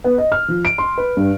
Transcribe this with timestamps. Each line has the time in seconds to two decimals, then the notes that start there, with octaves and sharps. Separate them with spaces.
0.04 B3
0.18 D#5
0.32 F6
0.48 F3
0.65 D7
0.78 C6
0.98 B4
1.17 G2